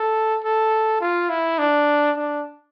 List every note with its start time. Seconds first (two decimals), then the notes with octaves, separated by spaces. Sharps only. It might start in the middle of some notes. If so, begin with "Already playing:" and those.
Already playing: A4
0.44 A4
1.01 F4
1.30 E4
1.59 D4
2.17 D4